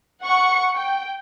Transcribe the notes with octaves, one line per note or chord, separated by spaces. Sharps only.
F#5 C#6 C#7
G5